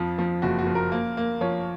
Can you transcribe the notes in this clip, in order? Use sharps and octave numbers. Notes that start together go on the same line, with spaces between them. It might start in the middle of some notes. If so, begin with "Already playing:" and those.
Already playing: F2 F3
F3
F#1 F#4
F#4
F3
A#4
A#3
A#3
F3 C#5